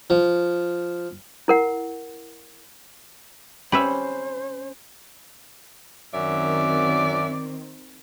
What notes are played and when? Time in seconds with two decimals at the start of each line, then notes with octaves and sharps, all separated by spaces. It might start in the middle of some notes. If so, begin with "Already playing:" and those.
0.10 F3
1.48 E4 A#4 F#5
3.72 C#4 G4 B4 C5 E5 B5
6.13 F#2 D#3 F#3 C4 D5 E5